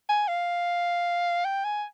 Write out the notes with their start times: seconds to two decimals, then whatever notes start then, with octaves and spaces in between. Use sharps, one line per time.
0.09 G#5
0.28 F5
1.45 G5
1.64 G#5